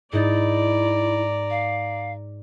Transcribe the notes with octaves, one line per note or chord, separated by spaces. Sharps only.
G#2 D#4 E4 D5 A#5 A6
F5